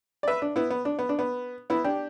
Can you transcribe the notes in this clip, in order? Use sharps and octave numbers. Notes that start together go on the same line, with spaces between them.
D5
B4 E5
D4
B3 E4
B3
D4
B3
D4
B3
B3 E4
D4 G4